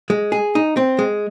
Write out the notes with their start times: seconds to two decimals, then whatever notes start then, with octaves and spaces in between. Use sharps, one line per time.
0.10 G#3
0.32 G#4
0.55 D#4
0.77 C4
0.99 G#3